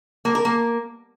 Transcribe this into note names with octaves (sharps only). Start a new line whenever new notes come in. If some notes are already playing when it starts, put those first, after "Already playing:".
A#3
A#4
A#3